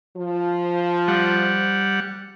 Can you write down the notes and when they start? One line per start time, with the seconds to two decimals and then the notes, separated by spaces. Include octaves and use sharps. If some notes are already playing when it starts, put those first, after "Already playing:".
0.17 F3
1.08 G3 F#5